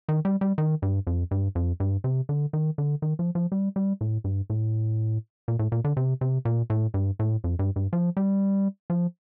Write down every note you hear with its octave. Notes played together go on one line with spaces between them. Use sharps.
D#3
G3
G3
D#3
G2
F2
G2
F2
G2
C3
D3
D#3
D3
D#3
F3
F3
G3
G3
A2
G2
A2
A#2
A2
A#2
D3
C3
C3
A#2
A2
G2
A2
F2
G2
G2
F3
G3
F3